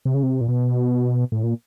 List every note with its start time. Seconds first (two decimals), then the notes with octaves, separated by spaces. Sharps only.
0.05 C3
0.14 C#3
0.23 C3
0.41 A#2
0.48 B2
1.32 A2
1.43 A#2